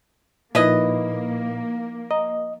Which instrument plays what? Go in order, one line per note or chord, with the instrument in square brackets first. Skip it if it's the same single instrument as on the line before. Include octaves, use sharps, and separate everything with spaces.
[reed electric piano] A#2 [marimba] F3 D#4 [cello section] A#3 [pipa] E4 B4 D#5
[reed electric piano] D#5 [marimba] A#5